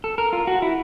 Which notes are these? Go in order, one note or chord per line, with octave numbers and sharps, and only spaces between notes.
A4
A#4
F4
F#4
E4